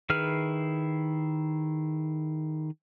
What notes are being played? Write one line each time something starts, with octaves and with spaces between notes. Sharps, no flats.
D#3 E4 G#4 B4 F6